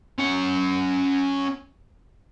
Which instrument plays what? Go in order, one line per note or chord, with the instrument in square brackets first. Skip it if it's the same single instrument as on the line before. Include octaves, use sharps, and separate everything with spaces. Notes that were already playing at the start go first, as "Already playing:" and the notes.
[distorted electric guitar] C#4 F#5